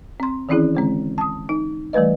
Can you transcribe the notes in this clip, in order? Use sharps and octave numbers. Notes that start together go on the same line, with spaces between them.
C4 C6
D#3 E3 C4 C#4 E4 G#4
D3 G#3 C4
A5 D#6
D#4
E3 G3 A3 B4 D#5